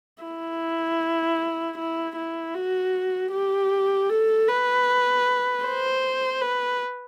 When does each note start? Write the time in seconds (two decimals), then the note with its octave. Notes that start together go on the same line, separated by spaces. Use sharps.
0.23 E4
1.78 E4
2.17 E4
2.55 F#4
3.33 G4
4.10 A4
4.48 B4
5.65 C5
6.42 B4